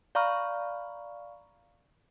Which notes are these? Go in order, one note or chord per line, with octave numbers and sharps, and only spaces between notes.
D5 F5 A#5 B5 C#6 F6